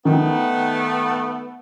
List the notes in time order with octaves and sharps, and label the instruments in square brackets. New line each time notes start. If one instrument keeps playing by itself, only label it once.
[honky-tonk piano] D#3 [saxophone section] A3 B3